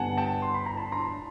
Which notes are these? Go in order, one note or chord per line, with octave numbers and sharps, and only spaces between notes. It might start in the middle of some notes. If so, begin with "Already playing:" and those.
Already playing: G2 D3 G3 B3 D4 F#5 G#5 A5
G5 A5
C6
B5
A#5
A5 B5
A#5 C6